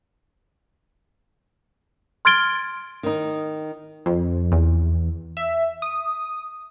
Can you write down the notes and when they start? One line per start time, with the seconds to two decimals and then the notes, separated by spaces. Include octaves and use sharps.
2.25 C6 F6 G#6 A6 D7 G7
3.03 D#3 D#4
4.06 F2
4.52 E2
5.37 E5
5.82 D#6